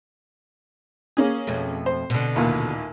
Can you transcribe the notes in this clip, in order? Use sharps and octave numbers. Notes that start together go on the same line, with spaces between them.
A#3 C#4 G#4
F2 B2 A3
C5
B2 D3
A1 D#2 A#2